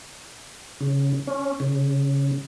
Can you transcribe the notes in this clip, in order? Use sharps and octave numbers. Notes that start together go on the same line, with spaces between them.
C#3
C#4
C#3